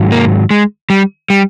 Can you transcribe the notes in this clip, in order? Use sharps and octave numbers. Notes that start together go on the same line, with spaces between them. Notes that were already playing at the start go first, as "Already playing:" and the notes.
Already playing: G#2 D#3 F#3
A#3
G#3
G3
G3